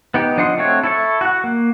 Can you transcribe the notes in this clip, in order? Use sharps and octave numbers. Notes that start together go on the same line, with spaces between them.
B3 D#4 G4
F3 D4 D#5 F#5 C6
A3 C4 F#4 C#5
E4 A4 C#6
F#4 F#5
A#3